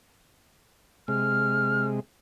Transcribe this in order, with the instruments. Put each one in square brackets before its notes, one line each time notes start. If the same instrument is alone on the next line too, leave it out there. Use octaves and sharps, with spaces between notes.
[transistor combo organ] C3 G#3 [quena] F6